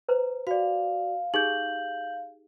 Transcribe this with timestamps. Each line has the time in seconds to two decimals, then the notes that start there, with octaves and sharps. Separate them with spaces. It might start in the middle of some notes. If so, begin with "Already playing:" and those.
0.09 B4 C5 A#5
0.47 F#4 D5 F5
1.34 D#4 G4 G#4 G6 F#7